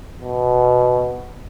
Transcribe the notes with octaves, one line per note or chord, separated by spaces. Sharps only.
B2